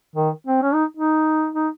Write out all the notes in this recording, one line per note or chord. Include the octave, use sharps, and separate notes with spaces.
D#3
C4
C#4
D#4
D#4
D#4